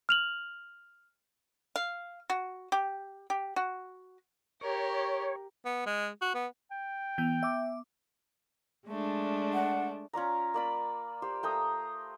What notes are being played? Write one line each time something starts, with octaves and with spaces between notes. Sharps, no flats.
F6 F7 F#7
F5
F#4
G4
G4
F#4
G4 A#4 C#5
B3
G#3
F#4
B3
G5
E3 B3 G6
E5 D6
G#3 A3 D4
F#5
C#4 F4 D5 A#5
A#3 D5 B5
G4 C5
A3 G5 A#5 D#6